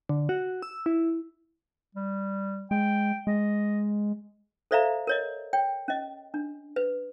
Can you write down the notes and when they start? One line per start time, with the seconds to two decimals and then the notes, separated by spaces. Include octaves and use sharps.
0.09 D3
0.29 F#4
0.62 E6
0.86 E4
1.95 G3
2.71 G#3 G5
3.27 G#3 D#5
4.71 A4 C5 D5 E5 F5 A#5
5.07 A#4 C#5 D#5
5.53 C#5 G5
5.88 C#4 D#5
6.34 D4
6.76 B4